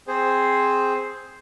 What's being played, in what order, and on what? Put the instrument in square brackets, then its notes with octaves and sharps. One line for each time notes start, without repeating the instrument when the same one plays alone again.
[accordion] C4 G#4 C5